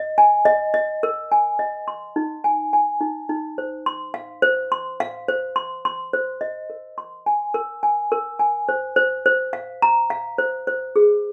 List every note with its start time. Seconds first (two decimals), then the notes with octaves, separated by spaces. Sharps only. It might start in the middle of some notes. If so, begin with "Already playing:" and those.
Already playing: D#5
0.18 G#5
0.45 D#5
0.74 D#5
1.03 A#4
1.32 G#5
1.59 D#5
1.88 C6
2.16 D#4
2.44 G#5
2.73 G#5
3.01 D#4
3.29 D#4
3.58 C5
3.86 C6
4.14 F5
4.42 C5
4.72 C6
5.00 F5
5.28 C5
5.56 C6
5.85 C6
6.13 C5
6.41 D#5
6.70 A#4
6.98 C6
7.26 G#5
7.54 A#4
7.83 G#5
8.12 A#4
8.39 G#5
8.69 C5
8.96 C5
9.26 C5
9.53 F5
9.82 A#5
10.10 F5
10.38 C5
10.67 C5
10.96 G#4